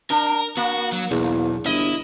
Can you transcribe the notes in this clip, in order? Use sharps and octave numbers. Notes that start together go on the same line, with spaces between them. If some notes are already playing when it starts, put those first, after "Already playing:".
D4 A#4
A#3 F#4
F#3
B1 E2
G1 E4 D#5